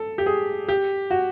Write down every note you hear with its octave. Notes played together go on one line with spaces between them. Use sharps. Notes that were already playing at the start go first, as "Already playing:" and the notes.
Already playing: A4
G4
G#4
G4
F#4